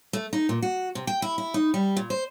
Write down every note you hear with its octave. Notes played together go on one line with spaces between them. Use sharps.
A3
D#4
A#2
F#4
C3
G5
E4
E4
D#4
G3
A#2
C5